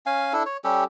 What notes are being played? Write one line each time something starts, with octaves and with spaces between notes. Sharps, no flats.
C#4 F5 G#5
D4 E4 A4
C#5
G3 C#4 G4 A4